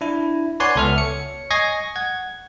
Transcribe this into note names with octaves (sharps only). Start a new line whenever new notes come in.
D4 E4
B4 C#5 D5 F#5 G#5 C6
C#2 B3 A4 E5 F6
C#5 C#7
D#5 G#5 C#6 G#6 A#6 C7
F#5 G#6